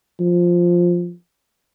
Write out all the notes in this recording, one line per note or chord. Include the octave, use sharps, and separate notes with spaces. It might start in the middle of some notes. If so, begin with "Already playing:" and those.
F3